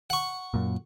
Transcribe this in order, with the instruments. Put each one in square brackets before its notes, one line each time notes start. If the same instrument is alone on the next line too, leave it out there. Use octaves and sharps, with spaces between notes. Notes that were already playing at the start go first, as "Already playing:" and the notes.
[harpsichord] F#5 C#6
[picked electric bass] F#2 A#2